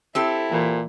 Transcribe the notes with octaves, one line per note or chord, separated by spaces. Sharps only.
C4 E4 G4 A4
A#2 E3